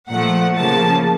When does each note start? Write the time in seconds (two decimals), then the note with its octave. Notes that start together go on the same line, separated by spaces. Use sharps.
0.09 A#2 F3 A3 F#5
0.55 C#3 F3 A#3 A5